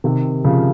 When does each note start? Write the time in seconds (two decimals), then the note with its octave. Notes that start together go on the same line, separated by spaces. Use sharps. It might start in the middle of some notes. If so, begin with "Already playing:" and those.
0.04 C3 D#3
0.45 C#3 F3